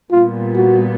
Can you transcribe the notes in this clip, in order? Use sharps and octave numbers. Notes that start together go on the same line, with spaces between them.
A#2 G3 B3 F4
F#4